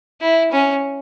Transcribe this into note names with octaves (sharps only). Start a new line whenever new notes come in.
E4
C#4